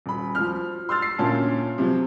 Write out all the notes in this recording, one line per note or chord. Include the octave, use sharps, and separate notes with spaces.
D#1 B5
F3 F6
C6 E6 F6 A6
C7
D2 A#2 C#4 A5
C3 F3 F#3